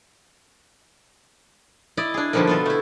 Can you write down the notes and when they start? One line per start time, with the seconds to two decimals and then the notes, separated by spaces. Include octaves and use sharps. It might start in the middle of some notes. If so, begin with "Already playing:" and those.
1.97 E4 D5 D#5
2.14 D4 G#4
2.33 B2 D3 D#3 F3 G3 A#3
2.47 B3 F4 A4
2.66 A3 E4